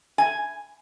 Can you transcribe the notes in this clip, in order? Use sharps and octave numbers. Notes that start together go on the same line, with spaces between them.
G#5